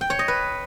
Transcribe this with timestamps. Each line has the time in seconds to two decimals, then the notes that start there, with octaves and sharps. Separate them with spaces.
0.01 G5
0.10 C#5
0.19 D#5
0.28 B4